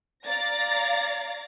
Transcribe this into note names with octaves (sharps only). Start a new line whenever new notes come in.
D5 F5 A#5 A6 A#6